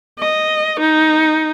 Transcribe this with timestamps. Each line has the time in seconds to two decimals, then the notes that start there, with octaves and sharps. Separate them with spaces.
0.20 D#5
0.80 D#4